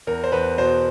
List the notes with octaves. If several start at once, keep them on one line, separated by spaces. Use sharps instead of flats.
E2 A#4
C5
E2 B4
B2 C5